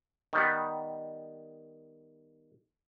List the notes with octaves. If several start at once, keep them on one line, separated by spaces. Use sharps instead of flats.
D#3 G3 B3